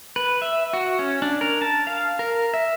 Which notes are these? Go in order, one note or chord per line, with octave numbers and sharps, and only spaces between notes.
B4
E5
F#4
C#4
D4
A#4
A5
F5
A#4
E5